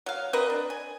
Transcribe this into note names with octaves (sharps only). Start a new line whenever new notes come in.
F#3 F5
C4 A#4 B4 D#5
D4
G#5